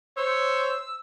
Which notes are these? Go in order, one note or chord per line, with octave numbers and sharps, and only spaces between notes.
C5 C#5 E6